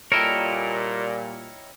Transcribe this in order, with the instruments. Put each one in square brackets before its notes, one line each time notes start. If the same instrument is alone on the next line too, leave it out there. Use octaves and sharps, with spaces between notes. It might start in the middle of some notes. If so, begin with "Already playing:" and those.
[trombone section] A#2 G3 [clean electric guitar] E4 A4 A#4 [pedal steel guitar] C#5 D#5 G5